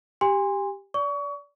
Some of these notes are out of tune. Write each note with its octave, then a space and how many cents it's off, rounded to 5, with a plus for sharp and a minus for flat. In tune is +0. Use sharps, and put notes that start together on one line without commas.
G4 +0 G#5 -35 C6 +0
D5 -30 C#6 +30